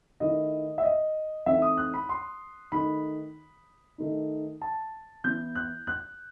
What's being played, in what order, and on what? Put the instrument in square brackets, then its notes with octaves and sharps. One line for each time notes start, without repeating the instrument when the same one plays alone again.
[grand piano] D#3 A3 E4 D#5
E5
D#5
E3 A3 C4 D#4 E5
D#6
F#6
B5
C6
D#3 A3 D#4 B5
D#3 A3 D#4
A5
E3 B3 E4 G6
F#6
F#6